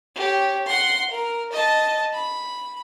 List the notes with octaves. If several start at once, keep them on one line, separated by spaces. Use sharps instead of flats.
G4 C#5
F#5 C6
A#4
D#5 A5
B5